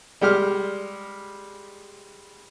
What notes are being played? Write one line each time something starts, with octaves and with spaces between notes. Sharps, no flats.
G3 G#3 G4 F6